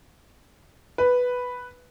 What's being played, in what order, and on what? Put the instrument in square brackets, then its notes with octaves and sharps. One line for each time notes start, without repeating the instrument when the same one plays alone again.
[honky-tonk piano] B4